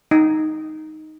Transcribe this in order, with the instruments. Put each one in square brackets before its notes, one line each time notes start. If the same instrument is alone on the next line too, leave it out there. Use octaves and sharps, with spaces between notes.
[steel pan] D#4